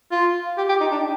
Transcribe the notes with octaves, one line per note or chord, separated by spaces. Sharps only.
F4
G4
G4
D#4
D4